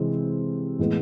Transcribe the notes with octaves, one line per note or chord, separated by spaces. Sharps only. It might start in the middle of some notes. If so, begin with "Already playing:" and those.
Already playing: C3 E3 G#3 C4
A2 E3 G#3 B3